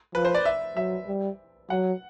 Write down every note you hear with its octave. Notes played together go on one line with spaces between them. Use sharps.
F3 B4
C5
D5
E5
F#3 E5
G3
F#3 F#5